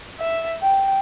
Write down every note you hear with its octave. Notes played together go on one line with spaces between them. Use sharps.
E5
G5